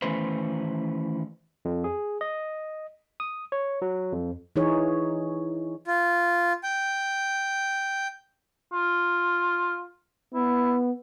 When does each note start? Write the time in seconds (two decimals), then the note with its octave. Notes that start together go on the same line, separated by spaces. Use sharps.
0.02 D#3 E3 A3 C#4 B4 C5
1.65 F2
1.84 G#4
2.21 D#5
3.20 D#6
3.52 C#5
3.82 F#3
4.13 F2
4.56 E3 D#4 G#4 C#5
5.87 F4
6.63 G5
8.73 F4
10.34 B3 E4